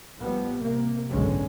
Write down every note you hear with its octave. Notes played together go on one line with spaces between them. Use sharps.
A1 F3 G3 B3
C3 A#3
F#1 B1 G#2 D3 G#3 C#4